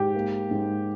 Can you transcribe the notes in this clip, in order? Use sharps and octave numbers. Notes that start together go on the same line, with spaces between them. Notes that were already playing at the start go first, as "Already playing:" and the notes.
Already playing: G#2 G4 G5
A#3
G#2